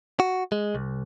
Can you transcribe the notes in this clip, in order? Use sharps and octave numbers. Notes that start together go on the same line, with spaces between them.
F#4
G#3
C2